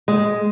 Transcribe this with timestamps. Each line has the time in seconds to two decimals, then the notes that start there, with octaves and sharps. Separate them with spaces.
0.08 G#3